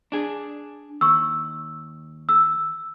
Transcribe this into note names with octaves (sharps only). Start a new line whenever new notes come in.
D4 G#4
D#2 C#6 E6
E6